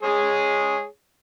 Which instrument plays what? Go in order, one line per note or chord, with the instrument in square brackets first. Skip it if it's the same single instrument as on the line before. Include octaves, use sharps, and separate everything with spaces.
[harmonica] G#3 G#4 C#5